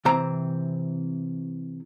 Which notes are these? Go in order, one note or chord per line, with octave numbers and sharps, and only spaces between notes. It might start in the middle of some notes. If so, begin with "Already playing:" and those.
C3 E3 C4 A#5